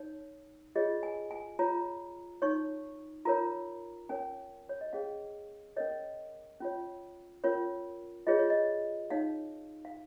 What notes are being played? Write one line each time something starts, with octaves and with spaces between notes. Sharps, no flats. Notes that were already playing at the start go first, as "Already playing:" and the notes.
Already playing: D#4 C#5
F4 G#4 C#5 D#5
G#5
G#5
F4 C#5 A#5
D#4 C#5 C#6
F4 A#4 C#5 A#5
C#4 A#4 C#5 G#5
C#5
D#5
C#4 G#4 C#5 F5
C#4 A#4 C#5 D#5
C#4 F4 C#5
C#4 F4 A#4 C#5
F4 G#4 C#5 D#5
C#5
D#5
D#4 C#5 F5
F5